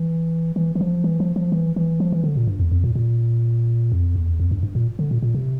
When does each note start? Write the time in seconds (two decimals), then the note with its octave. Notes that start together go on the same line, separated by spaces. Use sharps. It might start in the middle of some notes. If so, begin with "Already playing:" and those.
Already playing: E3
0.56 E3
0.75 E3
0.81 F3
1.04 E3
1.20 F3
1.36 F3
1.52 E3
1.76 E3
2.00 F3
2.12 E3
2.24 D3
2.36 A#2
2.48 G2
2.60 E2
2.72 F2
2.84 A#2
2.95 A#2
3.92 F2
4.15 E2
4.40 F2
4.51 G2
4.63 G2
4.75 A#2
4.99 D3
5.11 A#2
5.23 A#2
5.34 C3